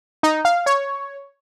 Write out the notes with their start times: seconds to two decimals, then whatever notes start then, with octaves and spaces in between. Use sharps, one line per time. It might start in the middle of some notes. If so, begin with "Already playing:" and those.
0.23 D#4
0.45 F5
0.66 C#5